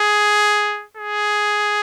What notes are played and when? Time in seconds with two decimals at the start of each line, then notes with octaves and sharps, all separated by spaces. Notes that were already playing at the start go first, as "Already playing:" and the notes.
Already playing: G#4
0.97 G#4